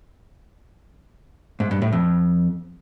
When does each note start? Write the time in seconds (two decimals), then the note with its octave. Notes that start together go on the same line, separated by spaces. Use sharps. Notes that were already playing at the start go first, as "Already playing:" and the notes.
1.60 G#2
1.71 G2
1.82 A2
1.93 F2